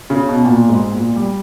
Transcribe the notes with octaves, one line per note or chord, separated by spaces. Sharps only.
C#3
B2
A#2
G#2
A#2
G3